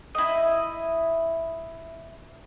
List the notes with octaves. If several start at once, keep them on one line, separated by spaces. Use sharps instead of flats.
E4 D#5